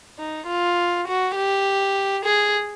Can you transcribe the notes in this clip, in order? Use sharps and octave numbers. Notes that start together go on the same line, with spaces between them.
D#4
F4
F#4
G4
G#4